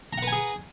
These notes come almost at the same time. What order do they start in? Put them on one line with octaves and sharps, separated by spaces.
A#5 F#5 B4 G#5 G#4